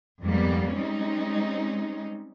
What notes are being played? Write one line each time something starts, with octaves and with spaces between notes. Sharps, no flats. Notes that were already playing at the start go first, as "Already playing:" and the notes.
F2 G#2 G3 A#3 B3
G3 G#3 C4 C#4 D#4